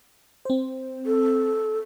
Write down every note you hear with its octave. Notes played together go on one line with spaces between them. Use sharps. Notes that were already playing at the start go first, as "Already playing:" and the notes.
C4 C5
A4